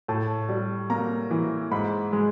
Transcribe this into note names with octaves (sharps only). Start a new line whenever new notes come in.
A2 A5
G3
A#3 A#5
E3
G#2 B5
G#3